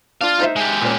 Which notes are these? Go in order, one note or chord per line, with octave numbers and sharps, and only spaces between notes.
D4 F4 F5
D#4 C5 E5
G#3 G4
A#2 C#4